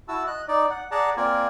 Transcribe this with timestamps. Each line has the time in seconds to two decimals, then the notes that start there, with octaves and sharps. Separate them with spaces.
0.08 E4 F#4 A5 E6
0.27 D#5 F#6
0.48 D#4 D5
0.70 F#5
0.91 G#4 D5 F#5 A5 A#5
1.17 A#3 C4 F4 A#4 D5 G#5